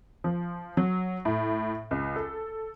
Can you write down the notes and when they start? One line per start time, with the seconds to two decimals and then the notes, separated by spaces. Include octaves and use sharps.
0.24 F3
0.77 F#3
1.25 A2
1.91 C#2
2.16 A4